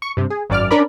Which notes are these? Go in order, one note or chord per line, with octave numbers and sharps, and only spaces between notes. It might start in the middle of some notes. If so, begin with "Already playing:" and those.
C#6
G2 C3
G#4
G#1 F#2 D5 D6 F6
C#4 D4 A#4 D5 B5